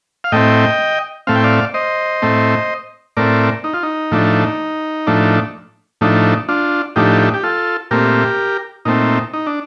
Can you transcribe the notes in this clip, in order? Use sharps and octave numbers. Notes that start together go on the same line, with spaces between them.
F5
A2 A3 C4 D#5 G5
A2 A3 C4 F5
G5
D5 F5
C5 D#5
A2 A3 C4
A2 A3 C4 A#4 D5
D#4
F4
D#4
A2 F3 A3 D4
A2 F3 A3 D4
A2 F3 A3 D4 D#4
D4 F4
A2 F3 A3 D4 D#4 G4
G4
F4 A4
A#2 A3 C4 G4 A#4
A#2 A3 C4 D#4
D#4
D4